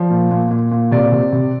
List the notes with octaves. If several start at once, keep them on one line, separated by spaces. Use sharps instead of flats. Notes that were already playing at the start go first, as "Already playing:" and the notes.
Already playing: F3 D5
A#2
A#2
A#2
A#2
C3 D5
C3
C3